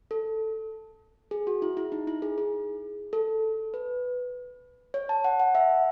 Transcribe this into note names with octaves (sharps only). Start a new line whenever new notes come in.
A4
G#4
F#4
E4
E4
D#4
E4
G#4
G#4
A4
B4
C#5
A5
F#5
F#5
E5